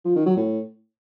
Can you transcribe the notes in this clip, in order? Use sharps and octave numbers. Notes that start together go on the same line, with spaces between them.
F3
D#3
F#3
A2